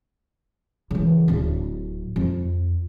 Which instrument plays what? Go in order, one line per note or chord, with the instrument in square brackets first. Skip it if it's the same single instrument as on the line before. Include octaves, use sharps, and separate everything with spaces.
[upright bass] C#3 E3
D1 D4
F2